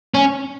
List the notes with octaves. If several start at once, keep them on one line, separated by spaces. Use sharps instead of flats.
C#4